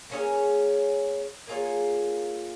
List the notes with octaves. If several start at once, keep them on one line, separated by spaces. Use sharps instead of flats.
A#3 C#4 G#4 C#5
A#3 F4 G#4 C#5